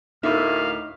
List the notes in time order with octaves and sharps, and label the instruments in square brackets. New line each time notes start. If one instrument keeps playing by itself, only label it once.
[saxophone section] D2 A2 A#3 [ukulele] D#4 [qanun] E5 [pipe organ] F5